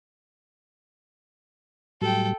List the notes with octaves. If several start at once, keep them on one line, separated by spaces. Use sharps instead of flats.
A2 F#3 G3 A4 G5